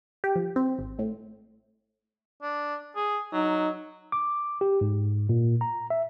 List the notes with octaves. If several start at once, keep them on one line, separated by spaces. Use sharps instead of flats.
G4
F3
C4
G#1
A2
D4
G#4
F#3 D#4
D6
G4
G#2
A#2
A#5
E5